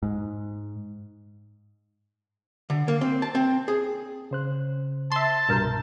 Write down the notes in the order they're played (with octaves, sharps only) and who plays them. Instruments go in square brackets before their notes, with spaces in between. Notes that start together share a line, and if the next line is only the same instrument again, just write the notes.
[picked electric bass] G#2
[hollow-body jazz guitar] D3
A#3
C4
A5
C4
G#4
[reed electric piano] C#3 C5 F#6
[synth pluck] E5 C6 [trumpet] A5
[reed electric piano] C2 G2 G6 [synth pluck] B2 A#4